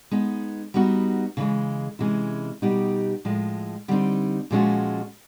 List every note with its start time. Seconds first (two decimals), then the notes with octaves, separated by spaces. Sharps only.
0.11 G#3 B3 D#4
0.74 G3 B3 D#4 F#4
1.37 C#3 E3 G#3
1.99 C3 E3 G#3 C#4 E4
2.62 B2 G3 B3 D#4 G4
3.25 A2 F3 G#3
3.88 D3 G3 C4 D#4
4.51 A#2 F3 G#3 C#4 F#4